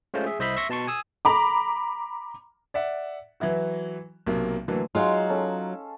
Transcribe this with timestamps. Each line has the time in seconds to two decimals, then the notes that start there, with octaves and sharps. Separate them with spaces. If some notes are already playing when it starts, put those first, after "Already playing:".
0.14 G#3 A3 C#4 F4 C5
0.26 G#4 E5
0.39 C2 C5 D#5 E5 B5 C6
0.57 E5 C6 C#6 A#6
0.69 B2 A5 C6 C#6 C#7
0.87 G#5 D#6 E6
1.25 A#5 B5 D6
2.74 D5 E5 F#5
3.40 E3 F#3 E4 F#4
4.27 B1 C3 F#3 A#3
4.68 D3 E3 F#3 A3 A#3
4.95 F#3 G#3 D#4 F4 F5
5.29 C#4 A4